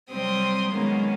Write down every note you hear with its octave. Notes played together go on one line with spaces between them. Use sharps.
C3 F#3 G3 C4 C6 D#6
D#3 F#3 G#3 A#3 B3 C#4